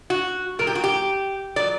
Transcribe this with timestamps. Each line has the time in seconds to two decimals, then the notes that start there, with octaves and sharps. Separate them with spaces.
0.10 F#4
0.59 A#2 F#3 A#4
0.67 G4
0.75 F#4
0.84 G4
1.56 A#2 F#3 D5